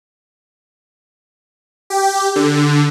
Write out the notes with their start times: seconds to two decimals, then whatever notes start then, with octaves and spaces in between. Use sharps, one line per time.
1.90 G4
2.36 D3